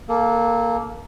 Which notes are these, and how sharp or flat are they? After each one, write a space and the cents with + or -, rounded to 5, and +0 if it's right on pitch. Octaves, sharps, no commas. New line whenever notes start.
A#3 +0 A4 -25